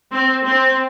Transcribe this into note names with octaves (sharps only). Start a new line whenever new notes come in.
C4
C4